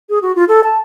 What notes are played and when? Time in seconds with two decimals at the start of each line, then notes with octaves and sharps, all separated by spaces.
0.09 G#4
0.22 F#4
0.35 F4
0.48 A4
0.64 A5